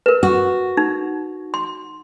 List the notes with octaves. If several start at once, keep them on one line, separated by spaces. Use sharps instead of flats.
A#4 B4
F#4
D#4
C6